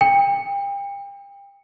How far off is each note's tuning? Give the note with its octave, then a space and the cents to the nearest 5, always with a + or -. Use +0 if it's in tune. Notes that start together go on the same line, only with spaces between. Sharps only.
G5 +35